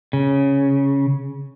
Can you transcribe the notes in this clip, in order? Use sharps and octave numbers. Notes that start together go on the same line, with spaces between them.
C#3